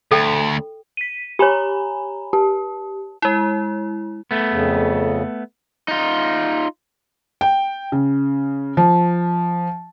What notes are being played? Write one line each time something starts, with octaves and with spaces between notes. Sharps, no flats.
D2 A4 G5
B6 D#7
G4 C#5 G#5 A#5 B5
G4 A5
G#3 E4
A3 B3
F2 C#3
D#4 F4
G5
C#3
F3